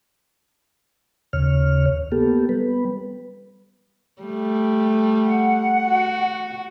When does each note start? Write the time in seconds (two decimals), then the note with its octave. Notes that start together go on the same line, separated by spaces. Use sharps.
1.33 D#2 C#3 C#5 F6
2.12 A#3 B3 G4 A4
2.49 G3 B3 B4
4.22 G3 A3
5.27 F#5
5.87 F#4